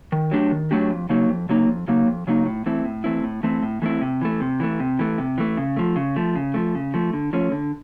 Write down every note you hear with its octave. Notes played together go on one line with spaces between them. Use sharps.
D#3
F#3 A3 D4 G4
D#3
F#3 A3 D4 G4
F2
C#3 F#3 A#3 D#4
F2
C#3 F#3 A#3 D#4
F2
C#3 F#3 A#3 D#4
F2
C#3 F#3 A#3 D#4
A2
E3 A3 C4 E4
A2
E3 A3 C4 E4
A2
E3 A3 C4 E4
A2
E3 A3 C4 E4
C3
E3 A3
C3
E3 A3
C3
E3 A3
C3
E3 A3
C#3
F3 A3
C#3
F3 A3
C#3
F3 A3
C#3
F3 A3
D3
F3 A3 C#4
D3